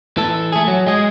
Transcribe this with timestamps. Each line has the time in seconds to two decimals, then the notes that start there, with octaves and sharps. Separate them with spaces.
0.17 E3 A4
0.52 A3 G#4
0.68 F#3
0.87 G#3 G#4